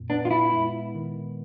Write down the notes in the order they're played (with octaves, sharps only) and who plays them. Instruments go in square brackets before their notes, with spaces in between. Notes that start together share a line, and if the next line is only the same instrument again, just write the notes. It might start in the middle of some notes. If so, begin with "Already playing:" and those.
Already playing: [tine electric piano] F2 A#2
[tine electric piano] B3 [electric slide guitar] D4
[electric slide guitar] F4
E4
[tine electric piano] G#3
D#3